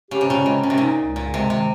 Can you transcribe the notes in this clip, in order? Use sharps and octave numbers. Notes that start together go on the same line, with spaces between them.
C#3 G4
C3
A#2 C#3
C3 G#3
A#2 C#4
C3
A#2 D#4
C#2
A#2 C#3
C3 G#3
C3 D#3